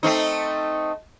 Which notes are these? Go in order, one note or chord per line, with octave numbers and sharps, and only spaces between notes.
A3 C4 D#4